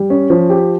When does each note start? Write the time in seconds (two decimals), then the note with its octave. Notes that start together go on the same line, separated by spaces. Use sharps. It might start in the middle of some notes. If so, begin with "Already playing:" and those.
Already playing: G3
0.10 C#4
0.30 F3
0.50 G4